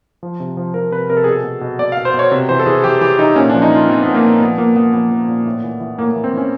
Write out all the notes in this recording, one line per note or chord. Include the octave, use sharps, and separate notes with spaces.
F3
C3
F3
F3 A#4
C3 B4
C3 A#4
A4
G#4
B2
A4
B2
B2
B2 D5
F5
B2
C5
B2
C#5
C3
E3 C5
A4
E3 G#4
E3 G4
E3 G4
E3 D#4
A#2 C#4
D4
F3
D#4
F3 F4
F3 C4
B3
A#2
A#3
A#2
B3
F3 B3
A#2 A#3
F3 B3
F3 B3
F3
A#2
A2
E3
E3
A2 A#3
A#3
E3
C4
E3 C#4